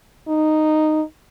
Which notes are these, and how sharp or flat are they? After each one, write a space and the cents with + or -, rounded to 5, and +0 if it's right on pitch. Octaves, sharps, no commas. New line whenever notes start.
D#4 -10